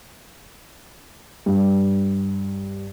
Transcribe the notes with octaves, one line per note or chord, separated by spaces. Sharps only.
G2